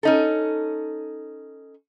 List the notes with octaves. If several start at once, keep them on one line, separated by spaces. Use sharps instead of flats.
C#4 D#4 A4